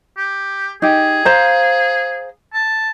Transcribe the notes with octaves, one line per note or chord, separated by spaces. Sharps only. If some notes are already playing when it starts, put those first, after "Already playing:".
G4
D#4 G4 G#4
C5 F5 A#5
A5